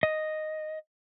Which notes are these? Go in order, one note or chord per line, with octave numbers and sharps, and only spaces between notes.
D#5